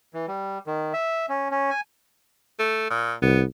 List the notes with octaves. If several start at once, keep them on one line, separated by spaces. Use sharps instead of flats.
E3
G3
D#3
E5
C#4
C#4
G#5
A3
A#2
C2 B3